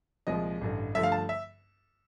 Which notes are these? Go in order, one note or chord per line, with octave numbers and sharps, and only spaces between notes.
C2 A#2 F3 G#3 D#5
A1 G2 D3
G2 D3 F3 A3 E5
F5
A5
E5